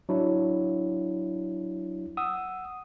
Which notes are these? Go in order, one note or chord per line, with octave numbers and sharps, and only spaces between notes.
F#3 D4 E4
F#5 D#6 E6